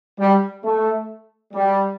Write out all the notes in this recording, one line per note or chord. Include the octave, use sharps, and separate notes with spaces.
G3
A3
G3